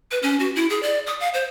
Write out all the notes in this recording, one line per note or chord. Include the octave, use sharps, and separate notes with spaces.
B4
C#4
F#4
E4
G#4
D5
D#6
F5
C5